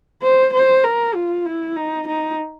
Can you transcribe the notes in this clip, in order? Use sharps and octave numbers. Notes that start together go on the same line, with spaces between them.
C5
C5
A#4
F4
E4
D#4
D#4